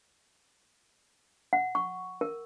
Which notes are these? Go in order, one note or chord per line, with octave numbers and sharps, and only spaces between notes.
F#5
C#6
A#4